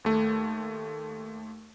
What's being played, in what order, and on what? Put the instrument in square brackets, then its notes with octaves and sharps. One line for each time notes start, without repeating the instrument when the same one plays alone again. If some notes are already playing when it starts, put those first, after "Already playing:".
[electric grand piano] D#2 A3